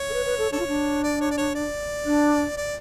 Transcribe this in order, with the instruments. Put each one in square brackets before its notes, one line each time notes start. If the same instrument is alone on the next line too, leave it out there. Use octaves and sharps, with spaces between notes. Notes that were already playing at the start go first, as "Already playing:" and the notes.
Already playing: [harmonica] C#5
[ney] A4
B4
B4
A4
[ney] D4 [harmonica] A4 C#5
[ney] F4
D4
[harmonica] D5
C#5
D5
C#5
D5
[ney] D4
[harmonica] D5